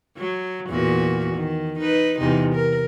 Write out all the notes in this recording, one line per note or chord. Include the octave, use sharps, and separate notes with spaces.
F#3
E2 A#2 F#4
D#3
D#4 B4
E2 C3 D#4
A#4